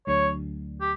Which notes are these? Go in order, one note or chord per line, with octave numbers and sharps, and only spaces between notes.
D2 D3 F#3 A3 D4 C#5
G4